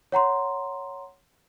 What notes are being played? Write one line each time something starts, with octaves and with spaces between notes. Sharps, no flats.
C#5 F#5 A#5 C6